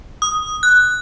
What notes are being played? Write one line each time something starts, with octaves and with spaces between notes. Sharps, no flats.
D#6
F#6